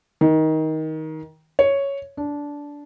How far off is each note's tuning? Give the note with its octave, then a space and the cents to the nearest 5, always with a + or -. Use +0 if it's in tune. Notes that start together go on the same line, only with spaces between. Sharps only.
D#3 +20
C#5 +0
D4 -15